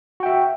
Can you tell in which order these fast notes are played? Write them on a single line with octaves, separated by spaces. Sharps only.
F#4 G5 E5